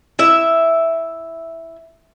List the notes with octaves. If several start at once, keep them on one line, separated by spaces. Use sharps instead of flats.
E4 E5